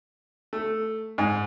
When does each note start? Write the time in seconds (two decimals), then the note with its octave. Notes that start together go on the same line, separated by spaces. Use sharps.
0.53 A3
1.18 G#2